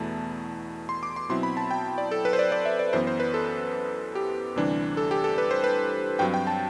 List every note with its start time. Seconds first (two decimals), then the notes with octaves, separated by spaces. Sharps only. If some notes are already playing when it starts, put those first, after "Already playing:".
Already playing: E2 B2 A3 E4 A5
0.89 C6
1.03 D6
1.16 C6
1.29 B2 F#3 C4 E4 C6
1.43 B5
1.57 A5
1.71 G5
1.98 D5
2.11 A4
2.25 B4
2.33 C5
2.39 D5
2.52 D5
2.65 E5
2.79 D5
2.93 F#2 E3 B3 C5
3.07 C5
3.20 B4
3.34 A4
4.15 G4
4.56 D2 C3 E3 G3 D4
4.97 A4
5.11 G4
5.24 A4
5.38 B4
5.51 C5
5.64 B4
6.19 G2 F#3 C4 G5
6.34 G5
6.47 A5